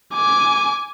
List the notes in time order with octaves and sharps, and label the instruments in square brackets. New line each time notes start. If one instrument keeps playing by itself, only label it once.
[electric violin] G#5 D6